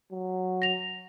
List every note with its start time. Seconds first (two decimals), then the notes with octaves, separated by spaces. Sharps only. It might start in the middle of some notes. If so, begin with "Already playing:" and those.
0.12 F#3
0.62 A#6 F7